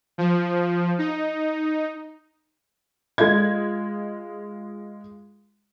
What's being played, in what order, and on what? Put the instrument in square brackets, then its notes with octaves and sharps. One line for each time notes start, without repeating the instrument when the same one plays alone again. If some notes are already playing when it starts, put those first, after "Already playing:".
[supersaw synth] F3
D#4
[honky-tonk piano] G#3 F4 G#6